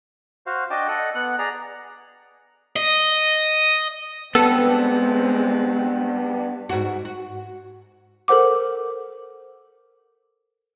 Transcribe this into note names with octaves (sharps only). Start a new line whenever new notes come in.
F#4 C5 F5
D4 F#4 D#5 G5 A5 D6
A4 D#5 F#5
B3 F#5 F#6
G#4 D5 A#5
D#5
G2 G#3 B3 C4 A4
G#2 F#4
F#4
A4 A#4 C5 F#5 D6